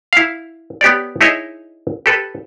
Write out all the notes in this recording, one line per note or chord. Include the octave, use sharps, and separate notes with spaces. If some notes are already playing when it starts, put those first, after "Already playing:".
E4 F5
B3 G4 C#5 D5
D#4 E4 G#4 C#5 D#5 E5
G4 A4 B4